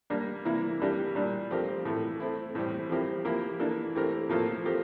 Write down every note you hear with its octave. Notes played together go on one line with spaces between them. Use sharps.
G3 A#3 D4
C3 E3 A#3 E4
E3 G3 D4 G4 A#4
A#2 G3 D4
F3 A3 C4 G4 A#4
A2 E3 A3
A3 C4 E4
A2 E3 G3 C4
F3 C4 E4 G4 A#4
F3 A#3 E4 G4 A#4
E3 A#3 D4 A4
E3 A3 C4 G4 A#4
A2 F3 A#3 F4 A4
F3 A3 C4 G4 A#4